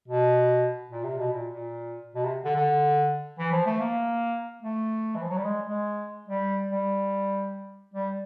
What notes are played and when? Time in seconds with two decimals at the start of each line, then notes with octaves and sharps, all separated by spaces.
0.08 B2
0.91 A#2
1.04 C3
1.18 B2
1.32 A#2
1.52 A#2
2.15 B2
2.25 C3
2.45 D3
2.56 D3
3.39 E3
3.52 F3
3.66 A3
3.80 A#3
4.62 A3
5.16 E3
5.23 F3
5.30 F#3
5.37 G3
5.45 G#3
5.66 G#3
6.28 G3
6.70 G3
7.94 G3